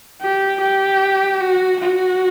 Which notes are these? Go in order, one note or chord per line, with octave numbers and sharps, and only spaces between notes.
G4
G4
F#4
F#4